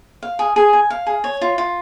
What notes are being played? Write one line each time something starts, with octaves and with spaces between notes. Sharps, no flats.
F5
G#4
G#4
G#5
F5
G#4
C#5
F4
F4